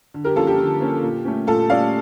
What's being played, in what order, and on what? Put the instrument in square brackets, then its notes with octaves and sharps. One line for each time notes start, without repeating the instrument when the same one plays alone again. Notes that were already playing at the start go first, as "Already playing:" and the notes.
[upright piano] D3
G4 A#4
F3 A#3 C#4 F4 A4
G4
D3
F3 A#3 C#4
A#2
A3 C#4
A#2 F4 A4
A3 C#4 D5 F5